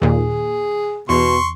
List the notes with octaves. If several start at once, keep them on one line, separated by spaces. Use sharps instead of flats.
D#2 A#2 G#4
E2 B2 C6 C#6